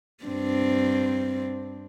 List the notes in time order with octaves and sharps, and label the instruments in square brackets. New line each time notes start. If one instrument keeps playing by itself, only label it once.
[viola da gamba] G2 C4 D4